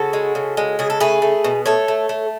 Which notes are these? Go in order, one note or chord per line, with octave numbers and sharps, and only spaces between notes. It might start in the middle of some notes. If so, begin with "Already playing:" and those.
Already playing: C#3 F#4 A4
G#3
C#3
G#3
C#3 G#4
A4
A3 G#4 B4
A3
B2
A3 A4 C#5
A3
A3